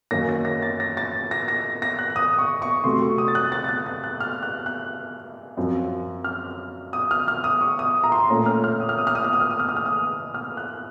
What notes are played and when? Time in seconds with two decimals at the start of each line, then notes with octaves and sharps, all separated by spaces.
0.11 F#2 D#3 A#3 C#4 A#6
0.29 A#6
0.45 A#6
0.62 A6
0.80 A#6
0.97 A6
1.31 A#6
1.48 A#6
1.82 A#6
1.99 F#6
2.16 D#6
2.39 C#6
2.62 C#6
2.84 C3 F#3 A3 C6
3.02 C#6
3.18 D#6
3.28 A6
3.35 F#6
3.52 A6
3.64 A6
3.69 F#6
3.86 A6
4.04 F#6
4.20 F6
4.43 F#6
4.66 F#6
5.57 F#2 F3 C4
6.24 F6
6.93 D#6
7.11 F6
7.28 F6
7.44 D#6
7.61 C#6
7.79 D#6
8.04 A#5
8.12 C6
8.30 A#2 A3 C#4 A#5
8.46 F6
8.64 F6
8.80 D#6
8.89 F6
8.99 D#6
9.07 F6
9.15 D#6
9.24 F6
9.33 D#6
9.41 F6
9.51 D#6
9.60 F6
9.69 D#6
9.77 F6
9.86 D#6
10.34 F6
10.57 F#6